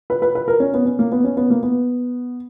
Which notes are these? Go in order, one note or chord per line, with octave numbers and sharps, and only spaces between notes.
B4
B4
B4
A#4
C#4
B3
C#4
A#3
B3
C#4
B3
A#3
B3